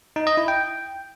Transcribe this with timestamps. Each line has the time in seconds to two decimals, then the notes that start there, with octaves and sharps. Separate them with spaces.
0.16 D#4
0.27 D#5
0.37 E4
0.48 G5